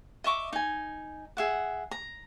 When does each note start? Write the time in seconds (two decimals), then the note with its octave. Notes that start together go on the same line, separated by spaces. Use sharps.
0.24 D#5 E5 C#6 D6
0.53 D#4 G#5
1.37 G#4 E5 F#5
1.91 A#5